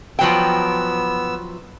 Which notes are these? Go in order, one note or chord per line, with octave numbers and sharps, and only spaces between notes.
F3 F#3 B3 G5 E6